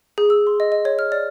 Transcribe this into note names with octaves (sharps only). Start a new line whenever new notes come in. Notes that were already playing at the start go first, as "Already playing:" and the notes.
G#4
E6
C6
D#5
D#5
C#5
F6
D5